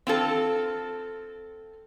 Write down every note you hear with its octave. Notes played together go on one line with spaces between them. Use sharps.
C4 F4 A4